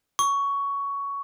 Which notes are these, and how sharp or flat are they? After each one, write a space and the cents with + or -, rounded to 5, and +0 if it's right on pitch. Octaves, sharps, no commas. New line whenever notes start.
C#6 +15